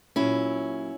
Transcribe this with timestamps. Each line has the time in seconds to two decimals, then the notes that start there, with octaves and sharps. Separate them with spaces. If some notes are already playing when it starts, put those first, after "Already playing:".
0.16 A#2 F#3 C#4 E4